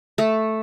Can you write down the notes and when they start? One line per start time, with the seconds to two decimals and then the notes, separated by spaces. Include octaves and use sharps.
0.18 A3 A4